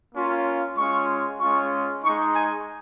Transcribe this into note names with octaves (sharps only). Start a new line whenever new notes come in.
A#3 C#4 F4
G#3 C#4 F4 C#6
G#3 C#4 F4 C#6
G#3 D#4 C#6
G#5